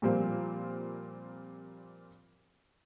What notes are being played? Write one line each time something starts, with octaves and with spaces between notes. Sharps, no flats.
A#2 F3 G3 A#3 C4